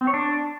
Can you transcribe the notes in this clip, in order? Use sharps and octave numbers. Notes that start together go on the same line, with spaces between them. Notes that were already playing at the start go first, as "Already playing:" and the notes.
C4
C#5
D4